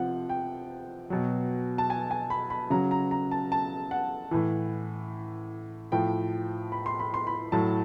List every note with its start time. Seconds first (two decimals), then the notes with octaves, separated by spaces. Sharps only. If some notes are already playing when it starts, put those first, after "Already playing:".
Already playing: C3 F3 F#5
0.29 G5
1.10 B2 F#3
1.78 A5
1.90 G#5
2.11 G#5
2.30 B5
2.50 B5
2.70 C#3 F#3 A#5
2.91 A#5
3.11 A#5
3.31 A5
3.52 A5
3.91 F#5
4.31 A2 E3
5.92 A2 F3 G5
6.72 B5
6.86 C6
6.99 B5
7.14 C6
7.27 B5
7.52 A2 F#3 A5